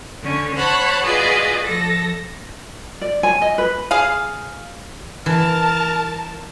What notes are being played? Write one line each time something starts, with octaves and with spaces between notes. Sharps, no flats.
D3 C#4
C5 C#5 F#5 A5 B5
F4 F#4 G#4 B4 D5 D#5
F3 A4 A#6
D5
G#5
D#5
B4
G#4 F5
E3 A#4 A5 F6